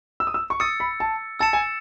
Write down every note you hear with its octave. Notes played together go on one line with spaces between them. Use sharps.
E6
D#6
E6
C#6
D#6 E6 A6 C#7
B5
A5
A5 E6 A6 C#7 E7
G#5